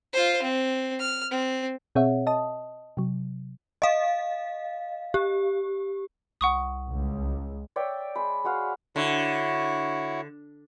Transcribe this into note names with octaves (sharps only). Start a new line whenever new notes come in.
F4 C5
C4
F6
C4
B2 C4 G#4 C#5 E5 F#5
D#5 A5 D#6
C3 F#3
D#5 F5
G4
C2 F#5 C#6 D#6
C#2
C#5 D5 E5 G5
G#3 B5
G#3 F#4 F5
D3 E4 F#4 C#5